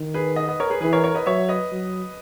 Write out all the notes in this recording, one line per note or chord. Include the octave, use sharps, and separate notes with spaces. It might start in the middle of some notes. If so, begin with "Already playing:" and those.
Already playing: D#3
G#4 B4
B4 D#5
B4 D#5
A#4 C#5
G#4 B4
E3 G#4 B4
A#4 C#5
A#4 C#5
B4 D#5
F#3 C#5 E5
B4 D#5
F#3